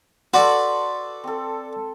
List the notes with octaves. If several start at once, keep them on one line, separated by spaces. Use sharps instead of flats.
F#4 A4 B4 D5 B5 C6
C4 A4